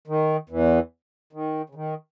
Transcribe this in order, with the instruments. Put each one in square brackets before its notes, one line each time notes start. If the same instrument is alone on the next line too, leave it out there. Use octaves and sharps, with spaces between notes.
[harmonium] D#3
E2 E3
D#3
C#3
D#3